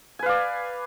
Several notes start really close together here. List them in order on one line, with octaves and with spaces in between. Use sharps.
G#5 B4 F5 D5